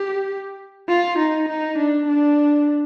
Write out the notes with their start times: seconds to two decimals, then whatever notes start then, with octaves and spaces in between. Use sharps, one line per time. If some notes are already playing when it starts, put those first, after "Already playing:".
Already playing: G4
0.89 F4
1.19 D#4
1.49 D#4
1.78 D4
2.08 D4